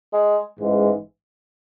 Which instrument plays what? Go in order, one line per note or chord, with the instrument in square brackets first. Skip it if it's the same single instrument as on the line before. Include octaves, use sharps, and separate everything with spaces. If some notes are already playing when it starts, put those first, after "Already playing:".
[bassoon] G#3
[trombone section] A1 G#2 E3 G#3